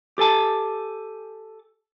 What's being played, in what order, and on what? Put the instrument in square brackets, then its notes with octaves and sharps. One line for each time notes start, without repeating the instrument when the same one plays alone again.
[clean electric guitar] G4 A4 G#5 A5